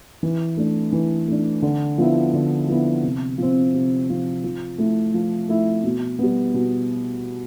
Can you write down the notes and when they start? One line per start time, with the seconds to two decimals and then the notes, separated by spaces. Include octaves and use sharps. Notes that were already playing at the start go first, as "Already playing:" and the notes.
0.23 E3
0.57 A3 D4
0.93 E3
1.28 A3 D4
1.62 D3
1.98 F3 B3 E4
2.33 D3
2.68 F3 B3 E4
3.03 C3
3.38 F3 C4
3.74 C3
4.08 F3 C4
4.44 F3
4.78 A3 E4
5.14 F3
5.49 A3 E4
5.84 B2
6.19 G3 B3
6.54 B2